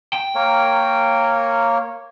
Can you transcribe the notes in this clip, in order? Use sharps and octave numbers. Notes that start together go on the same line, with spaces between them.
G5
A#3 A#4 C#5